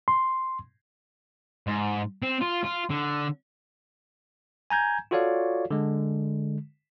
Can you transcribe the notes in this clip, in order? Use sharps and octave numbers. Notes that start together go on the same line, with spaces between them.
C6
G#2
C4
F4
F4
D3
G#5 A#5 G6 G#6
F4 F#4 A4 C#5 D5 F5
D3 G#3